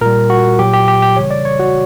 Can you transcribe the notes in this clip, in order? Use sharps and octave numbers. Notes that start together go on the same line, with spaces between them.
A#2 G3 A#4
F#4
A#2 F#3 G4
G4
G4
G4
C#3 E3 G3 C#5
D5
C#5
F#4